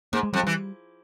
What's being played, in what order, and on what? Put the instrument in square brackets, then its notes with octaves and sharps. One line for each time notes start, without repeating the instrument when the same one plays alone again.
[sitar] G#2 [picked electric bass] A#3
[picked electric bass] G#3
[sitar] F2 [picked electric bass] G3
[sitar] E3 [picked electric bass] G3